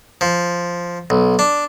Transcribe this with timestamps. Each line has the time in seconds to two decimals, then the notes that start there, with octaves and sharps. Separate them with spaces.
0.21 F3
1.10 B1
1.39 D4